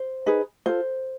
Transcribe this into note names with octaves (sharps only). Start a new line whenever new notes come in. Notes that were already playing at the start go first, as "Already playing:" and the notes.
Already playing: C5
D#4 G#4 B4
F4 A4 C5